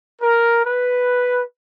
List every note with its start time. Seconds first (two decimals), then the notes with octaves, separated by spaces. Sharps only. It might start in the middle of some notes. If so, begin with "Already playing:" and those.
0.22 A#4
0.65 B4